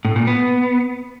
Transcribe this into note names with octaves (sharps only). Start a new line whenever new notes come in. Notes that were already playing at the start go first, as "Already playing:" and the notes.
A2
A#2
B3